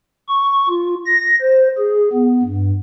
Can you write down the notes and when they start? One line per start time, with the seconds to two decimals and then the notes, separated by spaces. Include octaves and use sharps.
0.28 C#6
0.69 F4
1.06 A#6
1.41 C5
1.78 G#4
2.13 B3
2.43 G2